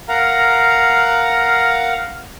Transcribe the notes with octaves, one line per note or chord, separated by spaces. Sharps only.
A#4 F5 F#5 A#5